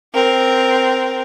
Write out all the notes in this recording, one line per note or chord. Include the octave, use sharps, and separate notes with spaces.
C4 A#4